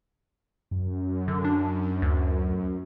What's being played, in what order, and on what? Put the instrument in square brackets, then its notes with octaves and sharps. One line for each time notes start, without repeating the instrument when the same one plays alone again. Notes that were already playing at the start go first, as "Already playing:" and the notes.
[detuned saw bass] F#2
[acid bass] D3
D4
D2